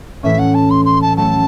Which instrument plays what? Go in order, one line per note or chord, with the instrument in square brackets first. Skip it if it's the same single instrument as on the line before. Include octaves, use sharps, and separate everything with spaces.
[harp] A2 E3 A3 C#4 [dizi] E5
[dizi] F#5
A5
C6
C6
A5
[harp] F#3 A3 C#4 [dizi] A5